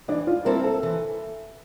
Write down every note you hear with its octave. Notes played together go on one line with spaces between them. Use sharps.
E3 D4
F4
G3 C4 E4 A4 A#4
A4
E3